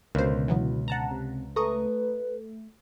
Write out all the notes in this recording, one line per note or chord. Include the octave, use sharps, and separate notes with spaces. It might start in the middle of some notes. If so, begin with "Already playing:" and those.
C#2 B2 D3 A#3 C5
E3 F#3 B3
F#5 A5 A#5
C3
A3 B4 A#5 C#6 D#6